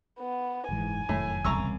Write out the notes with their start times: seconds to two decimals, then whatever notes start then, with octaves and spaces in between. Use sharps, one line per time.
0.20 B3
0.68 F#1 G#2 E3 G#5
1.09 F1 F#2 A2 D#3
1.44 E1 C2 C#3 A#5 C#6 E6